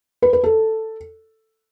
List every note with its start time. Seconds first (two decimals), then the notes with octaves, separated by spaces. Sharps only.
0.22 B4
0.33 B4
0.44 A4